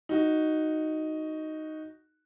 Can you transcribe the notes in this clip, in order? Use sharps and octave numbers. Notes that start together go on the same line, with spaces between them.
D#4 F#4